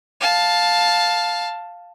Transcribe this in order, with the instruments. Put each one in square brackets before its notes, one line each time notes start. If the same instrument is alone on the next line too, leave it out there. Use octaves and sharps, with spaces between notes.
[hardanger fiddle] F5 A5